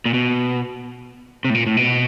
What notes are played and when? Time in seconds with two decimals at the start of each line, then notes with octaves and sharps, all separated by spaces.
0.06 A#2
0.14 B2
1.45 C3
1.50 A2
1.55 A#2
1.67 A2
1.77 B2